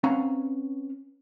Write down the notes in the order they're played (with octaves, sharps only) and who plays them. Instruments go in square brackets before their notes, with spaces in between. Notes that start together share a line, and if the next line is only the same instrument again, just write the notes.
[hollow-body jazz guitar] C4 C#4 B4 F5 F#5 A#5